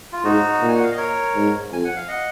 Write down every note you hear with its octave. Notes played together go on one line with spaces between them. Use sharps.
F4
G#2 D#4 F#4
A#2
G#5
F#5
F5
D#5
A#4 C#5
G#2
F2 G#5
F#5
F5
D#5 F#5